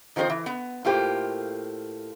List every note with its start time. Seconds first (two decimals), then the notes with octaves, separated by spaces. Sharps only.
0.16 D#3 F3 C4 B4 C5
0.30 E3
0.46 B3
0.85 A2 A#3 F4 G4 C5